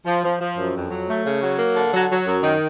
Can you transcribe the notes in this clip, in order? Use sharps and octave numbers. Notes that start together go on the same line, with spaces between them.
F3
F3
F3
F#2
F2
F#3
A3
C#3
F#3
A#3
D3
F#3
F#3
F#2
D#3